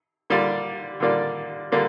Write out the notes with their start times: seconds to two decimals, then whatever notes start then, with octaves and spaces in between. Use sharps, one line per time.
0.30 D3 G3 A#3 F4 D5
1.00 D3 G3 A#3 F4 D5
1.72 D3 G3 A#3 F4 D5